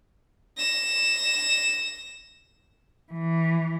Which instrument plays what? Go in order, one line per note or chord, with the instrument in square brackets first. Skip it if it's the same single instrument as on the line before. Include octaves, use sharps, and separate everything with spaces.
[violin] A#6 E7
[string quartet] E3